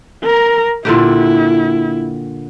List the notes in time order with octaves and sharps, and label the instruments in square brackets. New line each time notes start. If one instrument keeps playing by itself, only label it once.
[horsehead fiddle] A#4 A#5
[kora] A#2 D3 G4 [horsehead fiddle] E4